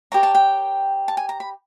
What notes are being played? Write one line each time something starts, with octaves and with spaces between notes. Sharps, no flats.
G4 A#4 C#5 A#5
A5
G5
A5
G#5
A#5
B5